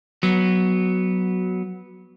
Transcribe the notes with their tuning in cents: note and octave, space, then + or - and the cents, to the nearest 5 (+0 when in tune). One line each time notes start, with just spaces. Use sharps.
F#3 +0 B3 -10